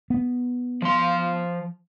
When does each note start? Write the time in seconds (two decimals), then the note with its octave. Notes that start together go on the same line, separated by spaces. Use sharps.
0.10 B3
0.82 F3 C6